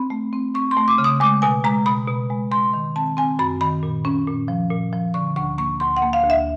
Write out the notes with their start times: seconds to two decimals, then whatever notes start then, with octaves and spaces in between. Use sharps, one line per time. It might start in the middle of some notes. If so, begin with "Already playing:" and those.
Already playing: C4 B5
0.10 A3
0.33 C4
0.55 C4 C#6
0.71 C6
0.77 A3
0.88 D6
0.98 C#3
1.04 D#6
1.20 G#3 D6
1.42 B2 G#5
1.64 G#3 A#5
1.86 B2 B5
2.08 B2
2.30 G#3
2.51 G#3 C6
2.73 D#3
2.96 C4 A5
3.17 C4 G#5
3.39 F#2 B5
3.61 D#3 B5
3.83 A#2
4.05 C#4
4.27 A#2
4.48 F3
4.70 A#2
4.93 F3
5.14 D3 C#6
5.36 D2 C#6
5.58 A#3 C#6
5.80 D2 C6
5.97 F#5
6.02 A#3
6.13 F5
6.24 D2
6.30 E5